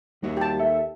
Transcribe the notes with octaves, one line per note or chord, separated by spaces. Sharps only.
D#2 G3 F#4 E5
G4 A5
A4 E5